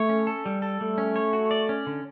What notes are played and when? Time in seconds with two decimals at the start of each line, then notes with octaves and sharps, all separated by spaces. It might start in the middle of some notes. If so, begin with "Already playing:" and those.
Already playing: A3 C#5
0.09 C#4
0.27 A4
0.46 G3
0.62 A4
0.80 G3 A3
0.98 C#4
1.16 C#5
1.33 F#4
1.51 D5
1.69 C#4
1.87 D3